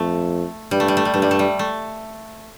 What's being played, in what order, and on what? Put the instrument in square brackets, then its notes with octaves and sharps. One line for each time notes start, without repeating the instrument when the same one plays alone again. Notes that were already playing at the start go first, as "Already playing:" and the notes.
Already playing: [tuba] F2 [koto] A3
[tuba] G2 [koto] G3
[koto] A3
G3
A3
G3
[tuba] G2 [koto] A3
[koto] G3
A3
G3
A3